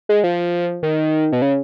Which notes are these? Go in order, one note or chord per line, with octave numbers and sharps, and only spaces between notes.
G#3
F3
D#3
B2
C#3